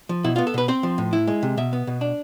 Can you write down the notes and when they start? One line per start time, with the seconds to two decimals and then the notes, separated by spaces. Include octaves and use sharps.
0.09 F3
0.24 B2 E4
0.36 B3 F4
0.47 A4
0.54 B2 B4
0.68 C4 C5
0.83 F3
0.98 A2
1.13 E4
1.28 G#3
1.43 C3
1.57 B2 E5
1.73 B3
1.87 B2
2.01 D4